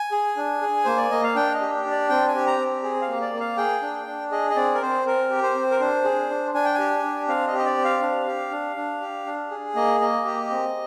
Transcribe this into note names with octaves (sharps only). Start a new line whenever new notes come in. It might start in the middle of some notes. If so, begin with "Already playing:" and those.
Already playing: G#5
G#4
D4
G#4
A#3 C5
D5
A#3 D#5
F5
D4 G5
D#5
G4
D4
D5
C4 G5
G#5
G4
A#5
C4
G#4
F5
A#3
D5
A#3
F5
G#4 G5
D4
D4
G#4 D#5
D#5
C4 D5
A#4
C4 C5
C4 A#4
G4
C5
C4
A#4
D4 C5
G#4
D4
D4 G#5
G5
G4 G#5
D4
C4 F5
D#5
G4
D#5
D5
C4
F5
D4
G4
D4
D4
G4
D4
G#4
A#3 D#5
A#3 D#5
G4
C4